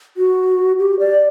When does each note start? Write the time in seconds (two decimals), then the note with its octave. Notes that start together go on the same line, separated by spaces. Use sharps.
0.17 F#4
0.79 G4
0.99 D5